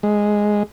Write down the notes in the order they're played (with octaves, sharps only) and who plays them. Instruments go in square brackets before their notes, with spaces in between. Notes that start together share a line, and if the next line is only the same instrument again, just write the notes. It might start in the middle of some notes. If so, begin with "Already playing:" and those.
[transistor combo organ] G#3